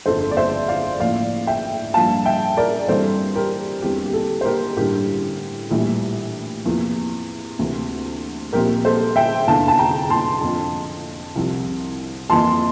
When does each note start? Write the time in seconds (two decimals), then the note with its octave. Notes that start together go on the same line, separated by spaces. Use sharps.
0.06 G1 F2 D3 A4 C5
0.31 D5
0.37 C5 E5
0.68 D5 F5
1.00 A1 A2 F3 A#3 D5 F5
1.47 E5 G5
1.94 G2 F3 A#3 F5 A5
2.25 E5 G5
2.57 A#4 D5
2.88 G2 E3 G3 C4 A4 C5
3.35 G4 A#4
3.82 E2 D3 G3 C4 G4
4.06 G4
4.13 A4
4.41 C5
4.45 G4 A#4
4.76 A1 G2 D3 G4 A#4
5.70 A#1 A2 E3 G3
6.65 E2 C3 F3 A#3
7.59 D2 C3 E3 A#3
8.53 A#1 A#2 F3 C4 G4 A#4
8.85 A4 C5
9.16 E5 G5
9.48 F1 E2 D3 A3 F5 A5
9.68 A5
9.79 G5 A#5
10.10 A5 C6
10.41 F2 D3 F3 C4
11.35 C2 C3 F3
12.30 F2 E3 A#3 A5 C6